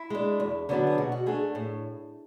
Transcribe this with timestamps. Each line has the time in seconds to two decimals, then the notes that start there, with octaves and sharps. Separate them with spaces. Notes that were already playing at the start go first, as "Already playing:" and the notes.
Already playing: E4
0.10 G#3 D4
0.40 E2
0.69 D3 F#3 B3 D4
0.87 G#4
0.98 B2 F#4
1.12 F#4
1.26 A3 D4 G#4
1.55 A2